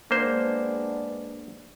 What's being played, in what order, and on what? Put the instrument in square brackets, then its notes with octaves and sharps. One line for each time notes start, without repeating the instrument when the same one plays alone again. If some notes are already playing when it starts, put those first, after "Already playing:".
[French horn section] G#3 B3 D4 [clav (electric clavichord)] A#3 C5